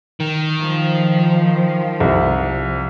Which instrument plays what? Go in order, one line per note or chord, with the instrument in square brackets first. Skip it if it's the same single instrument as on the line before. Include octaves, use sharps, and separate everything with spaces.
[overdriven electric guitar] D#3
[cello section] F3
[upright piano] C2